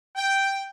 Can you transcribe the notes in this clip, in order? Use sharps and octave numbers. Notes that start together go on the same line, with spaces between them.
G5